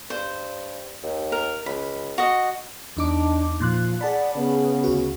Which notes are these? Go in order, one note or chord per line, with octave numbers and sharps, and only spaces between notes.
G2 C5
D#2
A#4
C#2 B5
F#4 D#5
E2 D4 D#4 D6
A#2 F3 C6 F#6
G#4 D5 F#5 A5 B5
C#3 B3
D2 F#4